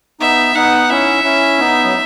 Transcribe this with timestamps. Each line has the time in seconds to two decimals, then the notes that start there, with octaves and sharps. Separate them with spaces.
0.20 B3 D#4 E5
0.55 B3 D#4 F#5
0.90 C#4 E4 E5
1.24 C#4 E4
1.58 B3 D#4
1.85 F#3